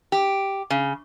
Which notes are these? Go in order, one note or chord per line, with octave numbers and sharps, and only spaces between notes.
G4
C#3